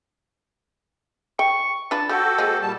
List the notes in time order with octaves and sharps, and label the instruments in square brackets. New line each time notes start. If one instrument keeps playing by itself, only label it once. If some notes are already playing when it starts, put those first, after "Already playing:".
[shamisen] G5 [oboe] C#6
[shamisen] D4 F4 B4 [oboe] A5
[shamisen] F3 [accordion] F#4 A4 [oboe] G4
[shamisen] F3 G#3 A#3
[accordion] A#2 G3 A5